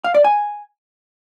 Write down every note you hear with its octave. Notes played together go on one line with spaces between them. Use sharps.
F5
D5
G#5